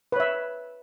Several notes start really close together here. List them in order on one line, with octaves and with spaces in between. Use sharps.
B4 C#5 E5